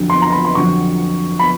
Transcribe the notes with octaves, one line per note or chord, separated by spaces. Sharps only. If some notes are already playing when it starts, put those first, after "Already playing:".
Already playing: F2 D3 F#3
C6
A#5
B5
C6
F2 D3 F#3 C#6
B5